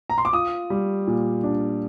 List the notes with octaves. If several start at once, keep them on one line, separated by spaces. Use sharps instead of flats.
A#5
C6
D6
F4 D#6
G3
A#2
D4